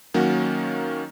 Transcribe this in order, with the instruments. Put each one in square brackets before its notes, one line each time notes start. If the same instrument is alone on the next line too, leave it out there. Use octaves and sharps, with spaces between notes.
[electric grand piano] D#3 F#3 A#3 C#4 F#4